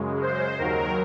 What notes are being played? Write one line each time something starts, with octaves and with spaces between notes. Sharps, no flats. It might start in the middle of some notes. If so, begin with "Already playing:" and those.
Already playing: F#2 C#3 G#3
C5
D#2 D#3 F#3 A#4